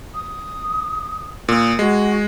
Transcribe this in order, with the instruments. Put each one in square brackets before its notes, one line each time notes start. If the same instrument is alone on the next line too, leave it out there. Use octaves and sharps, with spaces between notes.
[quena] D#6
[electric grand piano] A#2 [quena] D#6
[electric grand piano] G#3 [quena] F#4